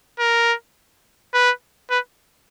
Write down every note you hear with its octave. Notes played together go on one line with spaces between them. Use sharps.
A#4
B4
B4